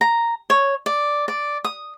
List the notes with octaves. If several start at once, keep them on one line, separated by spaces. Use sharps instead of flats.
A#5
C#5
D5
D5
D#6